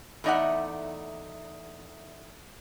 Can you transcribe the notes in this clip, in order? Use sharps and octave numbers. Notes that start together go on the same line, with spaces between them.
E2 A3 D#4 D5 E5 F#5